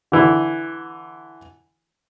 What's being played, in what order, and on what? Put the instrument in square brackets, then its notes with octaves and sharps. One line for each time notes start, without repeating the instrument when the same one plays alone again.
[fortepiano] D3 E3